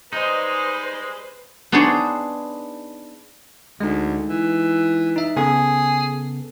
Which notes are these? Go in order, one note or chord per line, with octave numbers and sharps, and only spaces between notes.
G3 G#3 D#4 B4 C5 D#5
B3 D4 D#4 G#4 C5 C#5
D2 G#3 D#4
E3
D#4 E5
C#3 B3 G#4 A4